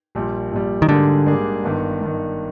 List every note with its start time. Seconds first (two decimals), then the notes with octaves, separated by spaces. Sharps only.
0.15 A#1 A#2 G3
0.51 A#1 A#2 G3
0.82 D#3
0.89 G#2 D3 G3 A#3 D4 G#4
1.26 G#2 G3 A#3 D4 G#4
1.64 G1 G2 D#3
2.01 G1 G2 D#3